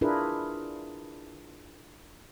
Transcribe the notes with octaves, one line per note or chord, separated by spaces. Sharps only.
D4 E4 F4 G#4 A#4 B4